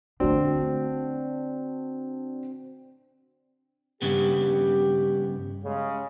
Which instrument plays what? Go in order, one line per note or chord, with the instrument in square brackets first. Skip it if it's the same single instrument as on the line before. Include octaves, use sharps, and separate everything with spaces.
[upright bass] D3 A3 [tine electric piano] C4 [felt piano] D4 F#4
[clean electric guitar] G2 C#3 B3 [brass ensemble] G4
[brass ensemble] C#3 G#3